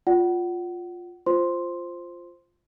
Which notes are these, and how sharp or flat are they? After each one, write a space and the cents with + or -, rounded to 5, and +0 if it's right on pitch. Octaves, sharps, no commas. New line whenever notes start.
F4 +10 D5 +0 F#5 +25
F4 +0 C5 +0 C6 +0